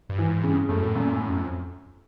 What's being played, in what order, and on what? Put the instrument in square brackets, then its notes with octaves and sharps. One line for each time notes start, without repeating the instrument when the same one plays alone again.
[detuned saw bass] G2
[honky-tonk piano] E3
[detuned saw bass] G#2
[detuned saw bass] G2 [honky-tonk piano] C#3
[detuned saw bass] F#2 [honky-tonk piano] A3
[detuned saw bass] A2
[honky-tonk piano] F#2 [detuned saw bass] A#2
[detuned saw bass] A2
[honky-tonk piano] F#2
[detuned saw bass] F2